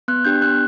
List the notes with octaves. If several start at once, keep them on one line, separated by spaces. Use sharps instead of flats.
B3 F#6
D4 G4 G6
B3 F#6